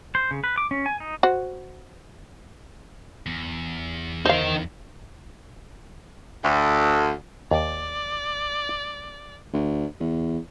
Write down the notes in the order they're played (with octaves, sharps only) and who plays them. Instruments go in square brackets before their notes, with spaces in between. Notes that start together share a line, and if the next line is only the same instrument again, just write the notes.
[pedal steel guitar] C5
C#3
B4
D6
C#4
G#5
D#4
[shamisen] F#4 C5
[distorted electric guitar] E2
[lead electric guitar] D#4 A#4 [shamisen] C5 F5
[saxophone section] D2
[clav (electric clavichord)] D#2 [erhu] D5
[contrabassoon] D2
E2